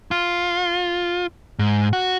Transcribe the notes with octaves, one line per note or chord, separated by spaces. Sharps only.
F4
G#2
F#4